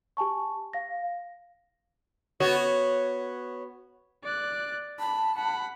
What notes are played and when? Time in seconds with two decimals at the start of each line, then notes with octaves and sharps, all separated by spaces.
0.17 G4 G#5 A5 C#6
0.73 F5 A#6
2.40 B3 F#4 C#5
4.24 D5 F#6
5.00 A5 B5
5.37 F#5 B5